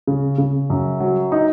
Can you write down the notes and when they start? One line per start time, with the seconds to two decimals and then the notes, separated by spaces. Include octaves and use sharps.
0.07 C#3
0.38 C#3
0.70 F#2
1.00 F#3
1.32 D#4